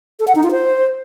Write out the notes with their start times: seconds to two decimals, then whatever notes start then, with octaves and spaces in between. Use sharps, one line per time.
0.20 A4
0.27 F#5
0.35 D#4
0.43 F4
0.51 C5